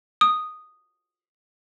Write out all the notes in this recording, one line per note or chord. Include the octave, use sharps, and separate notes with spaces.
D#6